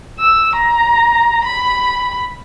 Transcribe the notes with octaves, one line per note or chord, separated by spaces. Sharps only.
E6
A#5
B5